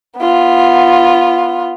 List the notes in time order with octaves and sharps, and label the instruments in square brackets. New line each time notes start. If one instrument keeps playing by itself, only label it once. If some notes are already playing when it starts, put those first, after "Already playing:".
[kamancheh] B3 F4